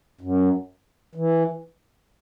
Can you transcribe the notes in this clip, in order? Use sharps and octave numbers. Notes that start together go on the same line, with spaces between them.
F#2
E3